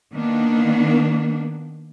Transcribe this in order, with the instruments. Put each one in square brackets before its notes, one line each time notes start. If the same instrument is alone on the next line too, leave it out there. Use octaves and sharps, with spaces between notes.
[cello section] D#3 A#3 B3 D4